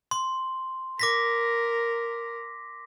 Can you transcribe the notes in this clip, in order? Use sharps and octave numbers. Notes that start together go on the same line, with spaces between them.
C6
A#4 D6 A#6 B6